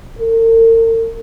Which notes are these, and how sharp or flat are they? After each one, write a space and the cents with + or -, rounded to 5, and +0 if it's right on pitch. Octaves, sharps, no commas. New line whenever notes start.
A#4 -40